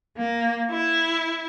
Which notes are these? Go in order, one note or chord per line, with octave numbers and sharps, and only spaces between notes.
A#3
E4